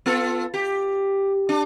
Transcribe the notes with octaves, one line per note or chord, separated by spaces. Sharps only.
B3 F4 A4
G4
D4